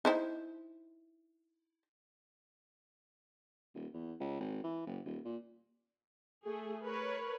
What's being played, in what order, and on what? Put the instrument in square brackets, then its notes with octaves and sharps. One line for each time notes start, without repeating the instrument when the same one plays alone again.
[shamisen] D#4 E4 C5
[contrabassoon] D#1
E2
C#2
G#1
E3
F#1
D#1
A#2
[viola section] A3 G#4
A#4 B4 C#5